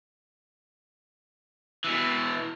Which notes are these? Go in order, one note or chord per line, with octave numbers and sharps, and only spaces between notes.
B2 E3